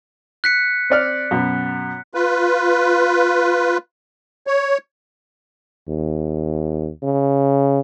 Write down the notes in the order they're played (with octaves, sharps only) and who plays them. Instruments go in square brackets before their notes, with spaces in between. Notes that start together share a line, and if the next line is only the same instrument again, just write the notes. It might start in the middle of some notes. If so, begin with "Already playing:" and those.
[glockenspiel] F#6 B6 C#7
[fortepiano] C4 D5 F6
F#2 B2
[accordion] F4 B4
C#5
[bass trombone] D#2
C#3